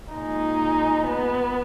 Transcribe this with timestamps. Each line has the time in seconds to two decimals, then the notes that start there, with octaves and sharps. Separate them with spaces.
0.14 A#2 G#3 D#4
1.09 B3